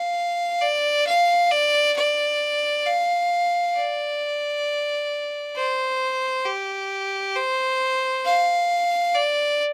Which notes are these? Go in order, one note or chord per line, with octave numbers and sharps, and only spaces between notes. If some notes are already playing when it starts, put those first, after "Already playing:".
Already playing: F5
D5
F5
D5
D5
F5
D5
C5
G4
C5
F5
D5